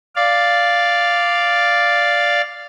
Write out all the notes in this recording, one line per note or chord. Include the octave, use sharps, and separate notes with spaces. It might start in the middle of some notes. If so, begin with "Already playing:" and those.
D5 F5